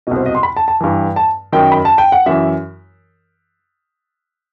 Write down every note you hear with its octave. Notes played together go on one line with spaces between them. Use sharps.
C2 B2 D#5
C5
D#5
C6
B5
A5
A5
G2 E3
A5
F#2 D#3 G5
B5
A5
G5
F#5
F#2 E3 E5